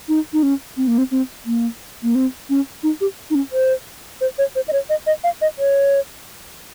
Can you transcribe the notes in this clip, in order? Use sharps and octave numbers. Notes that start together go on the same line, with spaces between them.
D#4
D#4
C#4
C4
A#3
C4
C4
A#3
A#3
C4
C#4
D#4
G4
D#4
C#4
C5
C5
C#5
C5
D#5
C#5
D#5
D#5
F5
D#5
C#5